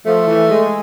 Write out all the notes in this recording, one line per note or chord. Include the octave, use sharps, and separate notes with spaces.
F3 A3
E3
G#3